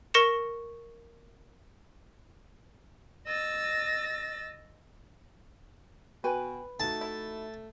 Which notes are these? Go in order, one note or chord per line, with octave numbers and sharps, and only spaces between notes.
A#4 C#6 A#6 C#7 E7
D#5 E6 A6 A#6
B2 F#4 B4 G5 G#5
A3 D#4 F#4 A5
E4